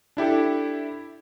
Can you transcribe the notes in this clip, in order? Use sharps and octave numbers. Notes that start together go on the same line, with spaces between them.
D4 E4 G4 A4